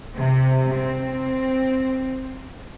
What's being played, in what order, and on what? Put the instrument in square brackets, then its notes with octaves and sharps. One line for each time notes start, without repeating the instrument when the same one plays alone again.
[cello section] C3
C4